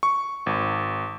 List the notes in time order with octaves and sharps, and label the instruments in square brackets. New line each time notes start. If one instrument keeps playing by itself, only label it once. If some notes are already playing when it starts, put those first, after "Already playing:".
[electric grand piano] C#6
G#1